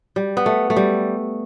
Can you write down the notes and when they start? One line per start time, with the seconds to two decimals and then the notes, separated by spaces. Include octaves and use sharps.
0.16 G3
0.37 B3
0.46 A3
0.70 A3
0.76 G3